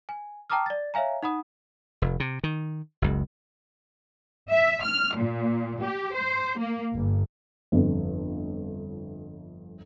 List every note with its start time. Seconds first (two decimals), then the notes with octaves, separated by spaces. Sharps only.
0.09 G#5
0.50 G5 A5 A#5 D6 D#6 F6
0.66 D5 A6
0.94 C#5 E5 F5 G#5 A#5
1.23 D#4 F#5 B5 D#6
2.02 F1
2.20 C3
2.44 D#3
3.02 F#1 C#2
4.51 E5
4.85 F6
5.18 A#2
5.83 G4
6.15 C5
6.59 A#3
6.95 G1
7.72 G1 F2